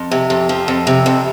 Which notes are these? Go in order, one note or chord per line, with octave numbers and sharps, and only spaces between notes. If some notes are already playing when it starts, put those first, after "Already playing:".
Already playing: F2
C3
F2
F3
F2
C3
F2